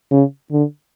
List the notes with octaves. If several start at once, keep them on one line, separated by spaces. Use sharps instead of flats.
C#3
D3